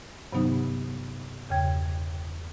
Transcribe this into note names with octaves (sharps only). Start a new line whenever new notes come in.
G2 C3 D#3 F#3 B3 D#4
E2 G2 C#3 G5 G#6